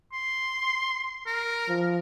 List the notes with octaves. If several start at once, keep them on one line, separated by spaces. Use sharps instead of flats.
C6
A#4
F3